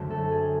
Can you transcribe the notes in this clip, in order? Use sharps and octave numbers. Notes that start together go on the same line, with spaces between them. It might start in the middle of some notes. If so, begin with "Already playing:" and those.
Already playing: F#2 D3 F#3 A3 C4
A4
G#4